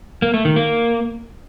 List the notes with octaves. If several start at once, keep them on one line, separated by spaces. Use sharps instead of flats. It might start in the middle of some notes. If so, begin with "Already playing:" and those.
A#3
A3
D#3
A#3